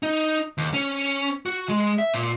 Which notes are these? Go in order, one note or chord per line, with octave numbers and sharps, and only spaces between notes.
D#4
D#2
C#4
F#4
G#3
E5
A#2